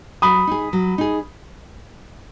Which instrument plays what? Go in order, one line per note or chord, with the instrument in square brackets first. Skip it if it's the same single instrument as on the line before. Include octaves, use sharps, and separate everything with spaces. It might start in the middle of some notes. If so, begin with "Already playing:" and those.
[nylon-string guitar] F#3 [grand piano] B5 D#6
[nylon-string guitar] D#4 G#4
F#3
D#4 G#4